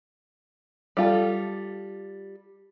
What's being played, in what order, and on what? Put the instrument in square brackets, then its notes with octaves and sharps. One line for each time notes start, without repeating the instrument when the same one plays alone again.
[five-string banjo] G3 F4 A4